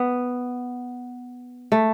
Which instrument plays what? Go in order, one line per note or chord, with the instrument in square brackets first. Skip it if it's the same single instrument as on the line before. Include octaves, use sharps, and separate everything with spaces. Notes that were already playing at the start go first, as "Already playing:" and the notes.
Already playing: [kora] B3
A3